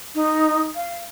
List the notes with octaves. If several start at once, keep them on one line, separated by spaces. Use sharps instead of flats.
D#4
F5